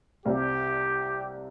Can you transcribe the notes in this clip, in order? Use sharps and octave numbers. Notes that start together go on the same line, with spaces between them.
C2 C3 G3 C4 F4 G4